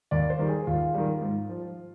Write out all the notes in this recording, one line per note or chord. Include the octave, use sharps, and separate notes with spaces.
D#2 D5
C5
D#3 G3
G#4
D#2 F4
D#3 G3
G#2
F3